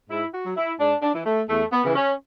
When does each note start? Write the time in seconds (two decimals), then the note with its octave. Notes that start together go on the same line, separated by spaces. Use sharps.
0.09 G#2 E4
0.33 F#4
0.44 F#3
0.57 E4
0.79 G#2 D4
1.03 D4
1.14 E3
1.25 A3
1.48 E2 A3
1.72 B3
1.84 C#3 E3
1.96 C#4